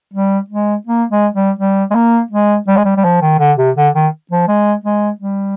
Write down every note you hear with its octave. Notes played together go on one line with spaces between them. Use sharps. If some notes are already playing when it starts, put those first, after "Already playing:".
G3
G#3
A#3
G#3
G3
G3
G#3
A#3
G#3
G3
G#3
G3
G3
F3
D#3
D3
C3
D3
D#3
F3
G#3
G#3
G3